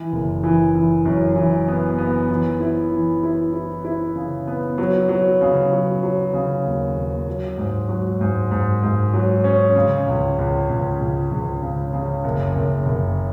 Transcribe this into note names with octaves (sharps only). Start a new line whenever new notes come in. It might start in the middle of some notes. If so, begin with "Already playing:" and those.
Already playing: E3
F#1
E3
E3
F#2
E3
B3
B3
E3
E4
E3
E4
E4
E4
C#3
B3
F#3
F#3
C#3
F#3
F#3
C#3
D#2
D#2
F#3
G#2
F#3
G#2
G#2
G#2
F#3
C#4
C#3
C#2
C#2
C#2
C#2
C#2
C#3
C#3
F#1
F#1
F#1